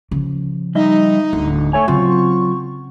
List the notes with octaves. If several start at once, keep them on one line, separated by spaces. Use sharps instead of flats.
C#3 F3
G3 D#4 D#5 E5
D1 D3
A3 C#5 G#5 C#6
C#3 F#3 C4 F4